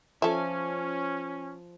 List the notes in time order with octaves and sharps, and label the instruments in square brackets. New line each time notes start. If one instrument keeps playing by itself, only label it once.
[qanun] F3 G#5 D6 [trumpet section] C#4 [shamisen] A4 E5